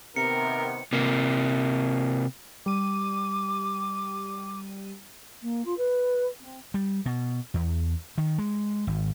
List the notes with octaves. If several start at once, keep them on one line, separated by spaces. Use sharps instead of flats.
C3 D#3 B3 A#4 C#7
C3 A#3
G3 D6 D#7
A#3
F4
B4
C4
G3
B2
E2
D#3
G#3
G#1